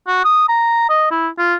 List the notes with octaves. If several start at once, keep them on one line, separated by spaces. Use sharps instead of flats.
F#4
D#6
A#5
D#5
E4
F4